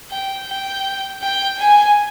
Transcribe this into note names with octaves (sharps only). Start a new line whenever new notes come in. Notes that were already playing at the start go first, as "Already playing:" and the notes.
G5
G5
G5
G#5